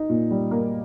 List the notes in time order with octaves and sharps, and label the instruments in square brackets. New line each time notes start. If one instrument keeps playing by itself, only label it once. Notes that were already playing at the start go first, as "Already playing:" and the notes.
Already playing: [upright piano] D#4
A#2
G3
A#3